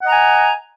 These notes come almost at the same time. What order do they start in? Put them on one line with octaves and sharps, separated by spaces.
F#5 D#5 A#5 G#5